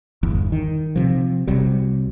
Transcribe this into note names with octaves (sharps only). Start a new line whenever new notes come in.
G1 E2
D#3
C3 F3
C2 C3 F#3 G3